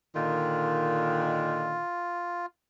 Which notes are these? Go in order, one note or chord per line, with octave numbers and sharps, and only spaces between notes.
A#2 D3 D#3 F4